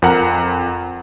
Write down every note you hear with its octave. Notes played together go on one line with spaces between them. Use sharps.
F2 A#4 F#5 A#5